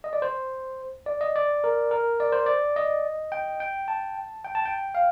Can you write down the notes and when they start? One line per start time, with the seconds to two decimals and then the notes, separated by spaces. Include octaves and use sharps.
0.04 D#5
0.13 D5
0.22 C5
1.06 D5
1.21 D#5
1.36 D5
1.64 A#4
1.91 A#4
2.20 D5
2.32 C5
2.46 D5
2.76 D#5
3.32 G5
3.60 G5
3.88 A5
4.45 G5
4.55 A5
4.65 G5
4.95 F5